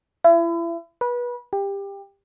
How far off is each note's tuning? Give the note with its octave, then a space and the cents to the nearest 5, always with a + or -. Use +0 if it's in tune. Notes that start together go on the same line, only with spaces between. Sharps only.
E4 +35
B4 -25
G4 +20